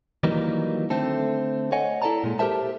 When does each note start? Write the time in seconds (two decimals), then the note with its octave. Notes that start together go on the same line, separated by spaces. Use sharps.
0.23 D#3 E3 F#3 G3 A#3 D#4
0.90 D3 A3 C4 A4
1.72 C#5 D#5 F#5 G#5
2.02 E4 A4 C5 D5 A5 A#5
2.24 A#2 G#3
2.39 G4 A4 A#4 C5 E5 A5